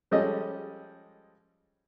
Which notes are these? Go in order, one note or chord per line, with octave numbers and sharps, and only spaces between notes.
F3 G3 G#3 C#4 A4 D#5